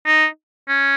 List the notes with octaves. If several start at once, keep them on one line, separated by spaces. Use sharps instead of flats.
D#4
C#4